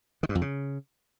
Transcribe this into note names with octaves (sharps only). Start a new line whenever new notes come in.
D#3
G2
F2
C#3